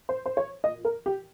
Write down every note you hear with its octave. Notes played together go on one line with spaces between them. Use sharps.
C5
C5
C#5
A#2 D#5
A#4
G4